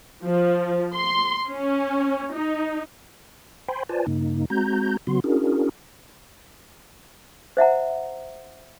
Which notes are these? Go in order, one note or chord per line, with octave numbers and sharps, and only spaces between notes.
F3
C6
C#4
D#4
C5 G5 G#5 B5 C6
F4 B4 C5 D5 G#5 A5
G2 C#3 A#3 D#4
G#3 C4 F#4 A#5 G6
C#3 F#3 B3 F#4 C6
C#4 D4 E4 F#4 G#4 A#4
C5 E5 F#5 A#5